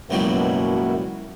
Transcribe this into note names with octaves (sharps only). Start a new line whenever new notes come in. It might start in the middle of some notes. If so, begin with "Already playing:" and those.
C#2 F#2 B2 F#3 G3 A#3 E4 F#4